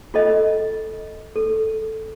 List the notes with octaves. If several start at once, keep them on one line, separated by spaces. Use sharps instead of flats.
F4 A4 D#5
A4